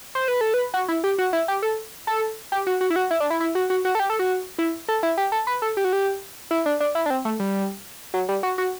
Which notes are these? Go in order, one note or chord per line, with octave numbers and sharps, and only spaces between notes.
C5
B4
A4
B4
F#4
E4
G4
F#4
E4
G4
A4
A4
G4
F#4
F#4
E4
F#4
E4
D4
E4
E4
F#4
F#4
F#4
A4
G4
A4
F#4
E4
A4
E4
G4
A4
B4
A4
G4
F#4
G4
E4
D4
D4
E4
D4
C4
A3
G3
F#3
G3
F#4
F#4